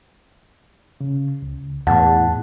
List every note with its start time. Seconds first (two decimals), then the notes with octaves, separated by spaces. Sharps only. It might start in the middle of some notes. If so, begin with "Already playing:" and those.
1.01 C#3
1.42 C#2
1.87 E2 A2 F#5 A5